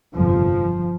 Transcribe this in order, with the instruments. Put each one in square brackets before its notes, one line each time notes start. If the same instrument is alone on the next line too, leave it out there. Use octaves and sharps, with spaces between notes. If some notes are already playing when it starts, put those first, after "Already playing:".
[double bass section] G1 F2 C3 F3